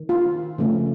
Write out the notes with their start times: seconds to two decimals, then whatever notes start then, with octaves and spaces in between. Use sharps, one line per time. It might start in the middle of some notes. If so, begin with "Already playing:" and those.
Already playing: D#3
0.09 F4
0.58 C#3 F3 A3 C#4